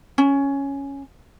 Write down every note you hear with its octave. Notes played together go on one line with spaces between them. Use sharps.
C#4